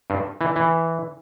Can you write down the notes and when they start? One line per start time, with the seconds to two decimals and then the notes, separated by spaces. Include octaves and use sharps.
0.10 G2
0.41 E3
0.56 E3